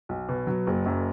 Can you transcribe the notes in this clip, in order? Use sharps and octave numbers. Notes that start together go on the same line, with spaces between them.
B1
B2
F#3
F#1
F#2